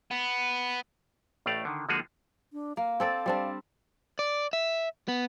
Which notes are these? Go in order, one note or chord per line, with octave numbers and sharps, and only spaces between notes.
B3
A1 A2 A3 D5 F5
D3 D#3
D3 F3 G#3 A#3 F#4 G#4
D4
A#3 F5
C4 A4 D5
G3 C4 D4
D5
E5
B3